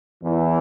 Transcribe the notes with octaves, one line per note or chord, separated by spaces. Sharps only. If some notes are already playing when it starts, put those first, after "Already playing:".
E2 E3